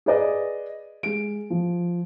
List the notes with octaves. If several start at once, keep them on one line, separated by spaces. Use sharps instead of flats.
G#4 B4 D5 D#5
G#3 D7
F3